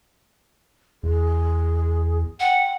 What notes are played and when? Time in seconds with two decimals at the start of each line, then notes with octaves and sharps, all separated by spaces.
1.03 E2 G#4
2.40 F#5 G5